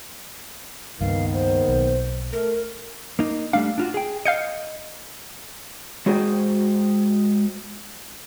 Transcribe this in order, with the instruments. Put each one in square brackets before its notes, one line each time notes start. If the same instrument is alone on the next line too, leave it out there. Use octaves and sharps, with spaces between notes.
[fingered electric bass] C#2 G2 [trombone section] D#3 A#3 B3 [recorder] F5
[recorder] C5
[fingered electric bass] B1
[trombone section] A3 [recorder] A#4
[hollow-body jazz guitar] A#3 D#4
[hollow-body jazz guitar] G3 A3 D4 [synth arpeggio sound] F5
[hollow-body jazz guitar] D4 F4 F#4
G#4 G5
[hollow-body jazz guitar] D#5 [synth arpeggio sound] F5 G6 C#7
[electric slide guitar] G#3 F#4 G#4 C5 G5